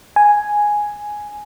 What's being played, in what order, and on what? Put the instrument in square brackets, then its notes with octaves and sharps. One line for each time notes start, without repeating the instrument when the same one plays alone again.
[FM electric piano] G#5